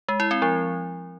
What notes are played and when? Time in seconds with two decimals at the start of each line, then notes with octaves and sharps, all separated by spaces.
0.09 G#3
0.20 E4
0.31 C4
0.42 F3